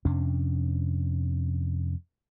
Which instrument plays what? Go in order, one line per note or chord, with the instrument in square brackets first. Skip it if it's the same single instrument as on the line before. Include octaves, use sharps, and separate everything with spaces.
[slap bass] F2 C3 C#4 D4